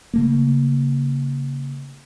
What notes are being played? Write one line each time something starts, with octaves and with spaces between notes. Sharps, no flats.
C#3 A3 A#3